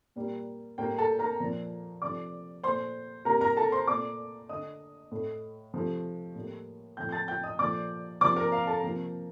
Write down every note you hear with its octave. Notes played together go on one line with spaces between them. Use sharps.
A#2 G3 A#3
A2 G3 A#3 G5
A4 A5
A#4 A#5
A#2 F3 A#3
C3 F3 A3 D5 D6
A#2 A3 C5 C6
C3 G3 A#3 A#4 A#5
A#4 A#5
A4 A5
C5 C6
A#2 A3 D5 D6
D3 A3 D#5 D#6
A2 A3
C3 F3 A3
A2 G3 A#3
A2 F3 A3 G5 G6
G6
A5 A6
G5 G6
D#5 D#6
A#2 F3 A3 D5 D6
C3 F3 A#3 D5 D6
A#4 A#5
F5
A4 A5
C3 F3 A#3